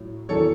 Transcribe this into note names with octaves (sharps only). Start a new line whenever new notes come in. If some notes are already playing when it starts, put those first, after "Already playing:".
Already playing: A2 F#3
E2 D#3 F#3 A4 C#5